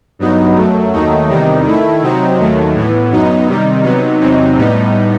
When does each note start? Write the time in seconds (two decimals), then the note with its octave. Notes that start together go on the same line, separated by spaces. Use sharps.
0.19 G2 F#3 B3 D#4
0.56 F#2 F#3 A3
0.93 D#2 D#3 F#3 A3 D#4
1.29 E2 C3 D#3 G3 D#4
1.65 D#3 A3 E4
2.01 C3 F#3 C4 D#4
2.38 D#2 D#3 F#3 A3
2.74 A2 E3 B3
3.10 F#2 F#3 B3 D#4
3.48 C3 D#3 G3 D#4
3.83 C3 F#3 B3 D#4
4.21 E2 C3 F#3 C4 D#4
4.56 A2 G3 B3 D#4